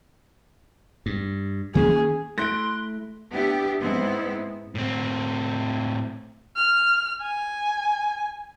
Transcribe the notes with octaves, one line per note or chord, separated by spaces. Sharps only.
G2
D#3 A#3 C#4 G#4
A3 E4 C6 F#6 A#6 D7
B3 D4 E4 G4
G#2 G#3 B3 C4 E4
A2 C4
F6
G#5